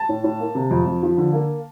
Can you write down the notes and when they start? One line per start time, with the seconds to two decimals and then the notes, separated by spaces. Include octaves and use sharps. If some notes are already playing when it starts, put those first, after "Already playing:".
Already playing: A5
0.09 A2
0.24 A2
0.40 A#3
0.55 C3
0.71 F2
0.86 F2
1.03 F3
1.17 D3
1.33 A#3